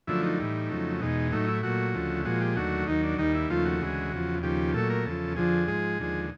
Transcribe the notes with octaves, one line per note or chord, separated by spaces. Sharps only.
F#2 D3 F3 A3 E4
D#4
A2 E3 G3
F2 C#3 F#3 A3
E2 B2 G#3 D#4
A2 F#3 A3 D#4
E4
A#2 F#3 A3 F#4
D2 C#3 F3 A3
A#2 F3 G#3 F#4
G4
D#2 D3 F#3 A3 F#4
D#2 D#3 F#3 D#4
D4
D#2 D#3 G3 D#4
E4
D#2 C#3 F3 A3 F4
F#4
D2 C#3 E3 G#3
E2 C#3 F3
D#2 C#3 F3 G4
A#2 F#3 A3 A4
A#4
E2 C#3 F3 A4
F2 D3 F3 G#4
G#2 F3 G#3
D#2 D3 F3 G#3